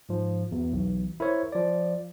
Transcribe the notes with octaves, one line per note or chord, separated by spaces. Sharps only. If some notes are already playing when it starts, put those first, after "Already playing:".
G#2 F3
E2 F#4
B1 E3
E4 A#4 C5 C#5
F3 D5